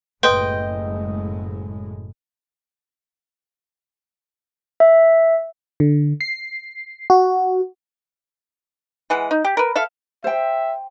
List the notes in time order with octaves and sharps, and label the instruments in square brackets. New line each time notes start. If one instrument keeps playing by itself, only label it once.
[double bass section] F#1 A2 G#3 [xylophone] B4 C6 [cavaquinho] D#5 G5
[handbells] E5
[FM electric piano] D3
C7
F#4
[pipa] E3 G#3 F#5
D#4
G4
A#4 B4
A4 E5 F5
[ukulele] C5 G5 [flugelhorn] E5